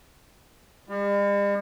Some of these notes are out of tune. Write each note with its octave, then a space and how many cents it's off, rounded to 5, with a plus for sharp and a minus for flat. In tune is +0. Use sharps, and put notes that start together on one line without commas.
G3 +45